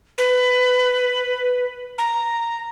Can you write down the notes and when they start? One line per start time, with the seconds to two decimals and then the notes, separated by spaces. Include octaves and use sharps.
0.18 B4
1.98 A#5